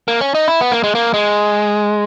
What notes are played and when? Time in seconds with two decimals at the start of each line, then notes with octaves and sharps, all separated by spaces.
0.08 A#3
0.21 C#4
0.35 D#4
0.48 E4
0.61 B3
0.72 A#3
0.84 G#3
0.95 A#3
1.14 G#3